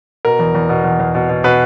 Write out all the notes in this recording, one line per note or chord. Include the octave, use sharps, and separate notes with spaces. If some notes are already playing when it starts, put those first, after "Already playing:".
B2 A#4
E2
E2
B2
E2
E2
B2
B2
B2 B4